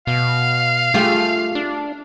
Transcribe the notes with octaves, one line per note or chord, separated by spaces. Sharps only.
B2 F5
A3 F4 G4 G#4
D4